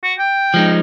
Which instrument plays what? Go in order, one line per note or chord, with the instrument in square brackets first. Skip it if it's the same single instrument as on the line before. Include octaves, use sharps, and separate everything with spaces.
[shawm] F#4
G5
[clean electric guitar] F3 G#3 D#4